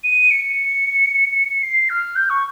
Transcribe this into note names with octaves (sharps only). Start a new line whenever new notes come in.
D#7
C#7
C7
F6
G6
C#6